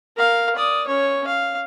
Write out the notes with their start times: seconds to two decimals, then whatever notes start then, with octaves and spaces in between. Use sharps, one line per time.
0.17 A#4 F5
0.55 D5 D#6
0.87 C#4 C#5
1.27 F5